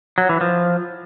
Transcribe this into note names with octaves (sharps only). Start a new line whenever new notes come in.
F#3
E3
F3